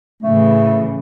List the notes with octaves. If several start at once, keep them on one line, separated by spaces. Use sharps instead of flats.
A2 C#3 E3 A3